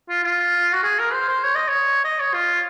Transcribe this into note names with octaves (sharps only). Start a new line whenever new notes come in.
F4
F4
F#4
G#4
A#4
C5
C5
C#5
D#5
C#5
D#5
C#5
F4